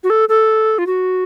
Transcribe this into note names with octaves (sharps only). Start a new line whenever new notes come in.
F#4
A4
A4
F4
F#4